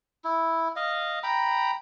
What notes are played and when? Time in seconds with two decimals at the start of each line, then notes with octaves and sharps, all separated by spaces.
0.24 E4
0.76 D#5 F5
1.23 G5 A#5 B5